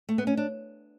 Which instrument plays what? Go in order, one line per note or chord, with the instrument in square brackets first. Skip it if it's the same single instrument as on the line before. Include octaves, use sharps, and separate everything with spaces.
[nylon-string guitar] A3
B3
C#4
D4